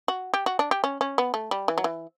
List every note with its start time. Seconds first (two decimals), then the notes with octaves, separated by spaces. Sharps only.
0.08 F#4
0.34 G4
0.46 F#4
0.59 D4
0.71 G4
0.84 C#4
1.01 C#4
1.18 B3
1.34 A3
1.51 G3
1.68 E3
1.78 F#3
1.84 E3